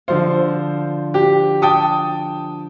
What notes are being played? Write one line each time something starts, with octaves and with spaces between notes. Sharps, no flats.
D3 F3 C5 F5
G4
G5 A5 D#6